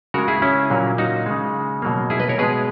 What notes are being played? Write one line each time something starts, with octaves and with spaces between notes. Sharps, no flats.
C#3 G#3 F#4 A#4
E4 G#4
C#4 E4
A#2 F#3 A#3
D#4 F#4
C#3 G#3
B2 F#3 A#3
E4 G#4
B4 D#5
A#4 C#5
B2 G#3 G#4 B4